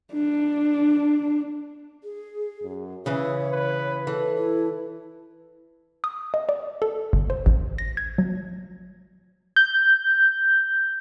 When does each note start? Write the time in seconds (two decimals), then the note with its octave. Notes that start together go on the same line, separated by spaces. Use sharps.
0.13 D4
2.04 G#4
2.63 F#2
3.06 C#3 E3 E4 G#4 C#5
3.51 B4
4.07 E3 A4
4.37 E4
6.04 D#6
6.34 D#5
6.49 D5
6.82 A4
7.13 G1
7.30 C5
7.46 A1
7.78 A#6
7.97 G#6
8.18 F#3
9.56 G6